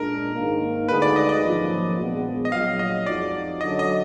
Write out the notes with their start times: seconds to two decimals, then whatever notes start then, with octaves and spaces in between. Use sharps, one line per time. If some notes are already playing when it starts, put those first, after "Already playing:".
Already playing: A#2 G#3 D4 G#4 A#4
0.34 G#2 D#3 A#3
0.88 D2 D3 G#3 D#4 G#4 B4
1.02 D5
1.16 D#5
1.29 D#5
1.43 G#1 F#2 F3 A#3
1.97 A#1 A#2 G#3 B3
2.45 D#5
2.52 A#1 A#2 F#3 F5
2.79 D#5
3.06 F2 F3 G#3 D#4 F#4 D5
3.61 F#2 D3 F#3 D#5
3.79 D#5